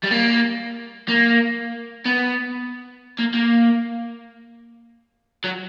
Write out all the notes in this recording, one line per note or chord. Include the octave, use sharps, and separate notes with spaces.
G3
A#3
A#3
B3
A#3
A#3
F#3